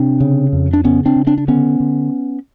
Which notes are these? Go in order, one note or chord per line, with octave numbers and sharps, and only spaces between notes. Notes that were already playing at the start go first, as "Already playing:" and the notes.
Already playing: C3 C4 D4
C#3
F2
D4
C#3 B3 C#4
C4 D4
C#3
C4 D4
D4
D3 B3 C#4
D3